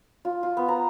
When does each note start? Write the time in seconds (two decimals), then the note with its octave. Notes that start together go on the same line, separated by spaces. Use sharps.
0.25 F4
0.43 F4
0.57 B3
0.68 A#5